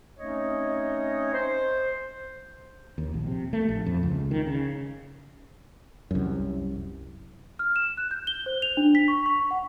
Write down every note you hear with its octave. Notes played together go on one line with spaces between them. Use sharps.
A3 C4 C#4 D#4 C#5 D#5
C5
D#2
A#1
C3
A3
A#1
F2
C#2
D#3
C#3
C2 F#2
F6
E7
F#6
G6
G7
C5
F7
D4
B6
C#6
C#6
F#5